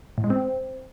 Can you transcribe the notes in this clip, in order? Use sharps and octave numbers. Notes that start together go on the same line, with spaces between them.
A2
G#3
C4